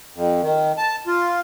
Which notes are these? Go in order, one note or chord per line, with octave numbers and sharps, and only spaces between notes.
F2
D#3
A5
F4